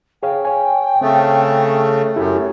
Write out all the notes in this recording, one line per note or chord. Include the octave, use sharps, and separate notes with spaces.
G#4 C#5 F5 G5
C#5 G#5
C#3 A3 C4
F#2 A3 E4 G4 C#5